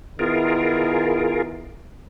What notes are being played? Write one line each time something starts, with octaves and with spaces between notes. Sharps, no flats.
D#3 B3 E4 F4 G#4 A#4